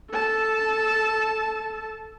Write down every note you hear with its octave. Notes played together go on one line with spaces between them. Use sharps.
A4 A5